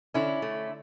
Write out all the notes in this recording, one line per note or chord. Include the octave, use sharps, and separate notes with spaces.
D3 C#4 E4
A3